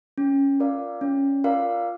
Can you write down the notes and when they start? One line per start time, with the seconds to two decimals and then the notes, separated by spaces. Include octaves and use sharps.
0.18 C#4
0.60 F4 A#4 D5 F5
1.01 C#4
1.44 F4 A#4 D5 F5